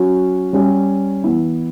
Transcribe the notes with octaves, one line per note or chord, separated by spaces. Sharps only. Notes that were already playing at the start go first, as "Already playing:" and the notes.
Already playing: F#3 C#4 F#4
G3 C#4 G4
E3 B3 E4